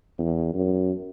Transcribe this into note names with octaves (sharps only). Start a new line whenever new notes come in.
E2
F#2